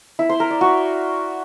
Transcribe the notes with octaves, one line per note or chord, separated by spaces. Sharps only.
E4
C5
A#4
D5
F#4